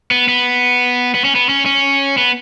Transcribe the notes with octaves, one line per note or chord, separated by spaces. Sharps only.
B3
B3
B3
C#4
B3
C#4
C#4
B3